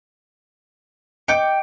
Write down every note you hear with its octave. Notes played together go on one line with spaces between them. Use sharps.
D#5 G5 D6 G6 C#7 D7